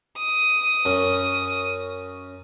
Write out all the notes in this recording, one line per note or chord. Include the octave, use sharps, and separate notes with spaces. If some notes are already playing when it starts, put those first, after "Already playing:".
D#6
F#2 C#4